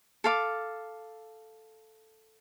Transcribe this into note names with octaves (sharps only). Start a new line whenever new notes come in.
A4 F5 D6